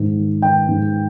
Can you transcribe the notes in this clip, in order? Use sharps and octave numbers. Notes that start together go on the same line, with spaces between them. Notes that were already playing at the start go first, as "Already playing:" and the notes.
Already playing: G#2 D#3
D#3
D#3 G5
G#2